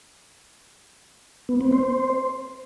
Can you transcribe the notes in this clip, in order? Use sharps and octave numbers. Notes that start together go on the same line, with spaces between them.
B3
C4
C5